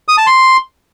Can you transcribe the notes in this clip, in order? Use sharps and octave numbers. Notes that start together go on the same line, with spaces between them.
D#6
A5
C6